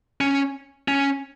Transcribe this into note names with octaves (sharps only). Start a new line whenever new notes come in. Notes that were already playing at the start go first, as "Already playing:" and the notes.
C#4
C#4